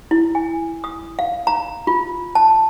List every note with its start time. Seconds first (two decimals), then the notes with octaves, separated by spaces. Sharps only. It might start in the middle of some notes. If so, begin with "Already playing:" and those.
0.11 E4
0.35 G#5
0.84 D#6
1.19 F5
1.47 A#5
1.87 F4
2.35 A5